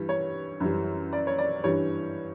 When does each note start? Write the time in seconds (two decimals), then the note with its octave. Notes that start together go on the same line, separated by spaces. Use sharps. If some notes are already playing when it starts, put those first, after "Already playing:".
Already playing: G2 E3 G3
0.09 C#5
0.60 F#2 E3 G3
1.13 D5
1.27 C#5
1.38 D5
1.64 G2 E3 G3 C#5